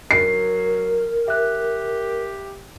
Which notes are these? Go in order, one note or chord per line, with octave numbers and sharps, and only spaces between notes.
F#3 A#4 C7
G4 E5 F#6